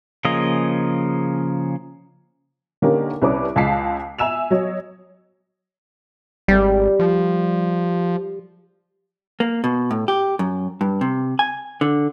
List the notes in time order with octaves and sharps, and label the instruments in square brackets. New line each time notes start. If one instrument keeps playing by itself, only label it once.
[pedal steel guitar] C#3 F3 A#3 G#4 D#5
[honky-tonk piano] D3 A#3 C#4 D#4 G4 A#4
C2 C#4 B4 D5 D6
C#2 G#3 A5 B6 C7
E5 G#5 E6 E7 F7
F#3 C#5 D#5
[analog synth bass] G#1 [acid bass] G3
[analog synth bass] F3
[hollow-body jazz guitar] A#3
B2
A2
G4
F#2
G2
C3
G#5
D3